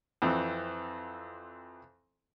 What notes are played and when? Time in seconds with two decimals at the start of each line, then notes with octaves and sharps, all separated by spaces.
0.22 F2 E3 C4